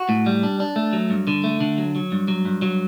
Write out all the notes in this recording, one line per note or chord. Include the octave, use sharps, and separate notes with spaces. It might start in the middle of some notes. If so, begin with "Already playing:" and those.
Already playing: F#4
A2
G3
D4
D4
A3
F#3
G2
D3
A3
D3
F#3
F#3
G2
F#3
G2
F#3